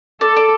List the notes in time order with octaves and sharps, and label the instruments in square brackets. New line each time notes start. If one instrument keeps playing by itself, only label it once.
[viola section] A4 [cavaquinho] D5
[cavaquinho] D5